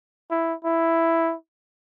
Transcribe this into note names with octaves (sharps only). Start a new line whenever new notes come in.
E4
E4